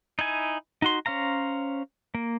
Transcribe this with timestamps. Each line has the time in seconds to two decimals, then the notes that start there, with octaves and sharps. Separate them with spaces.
0.19 D#4 E4 G#5
0.82 D#4 F#4 C6
1.06 C#4 C5 F5 A#5
2.15 A#3